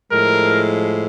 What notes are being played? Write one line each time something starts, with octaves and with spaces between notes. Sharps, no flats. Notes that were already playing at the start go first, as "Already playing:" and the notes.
A2 F3 G#3 A#4